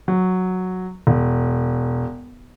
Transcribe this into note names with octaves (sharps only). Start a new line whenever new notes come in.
F#3
E1